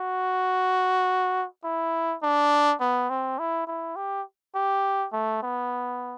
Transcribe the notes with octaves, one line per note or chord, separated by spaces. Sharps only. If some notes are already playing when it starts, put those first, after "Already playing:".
Already playing: F#4
E4
D4
B3
C4
E4
E4
G4
G4
A3
B3